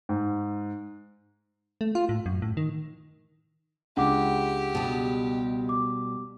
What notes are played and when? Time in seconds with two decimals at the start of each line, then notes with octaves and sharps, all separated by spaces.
0.09 G#2
1.81 A3
1.95 F4
2.09 A2
2.26 F#2
2.42 A2
2.57 D#3
3.97 C#2 D4 G4 F#5 D6
4.75 B2 G3
5.69 D6